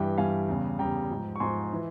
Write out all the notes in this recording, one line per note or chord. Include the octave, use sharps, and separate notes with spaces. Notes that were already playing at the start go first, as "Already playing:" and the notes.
Already playing: G2 E3 G3 E5 G5
G2 E3 G3 F5 G#5
E2 C#3 G3
E2 C#3 G3 G5 A#5
G#2 F3
C#6
G#2 F3 G#5 C6
E3